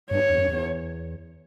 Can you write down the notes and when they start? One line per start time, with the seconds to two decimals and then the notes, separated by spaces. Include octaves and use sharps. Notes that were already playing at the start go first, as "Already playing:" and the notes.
0.11 G2 C#5
0.30 E2
0.38 F#2
0.48 E2